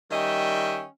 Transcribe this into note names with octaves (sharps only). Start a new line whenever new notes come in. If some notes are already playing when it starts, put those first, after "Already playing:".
D#3 G3 C#4 D#5 E5 G5